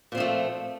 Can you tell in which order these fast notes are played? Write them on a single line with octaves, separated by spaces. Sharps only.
A#2 C4 F3 A3